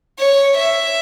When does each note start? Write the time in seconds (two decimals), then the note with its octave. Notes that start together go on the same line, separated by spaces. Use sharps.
0.19 C#5
0.57 E5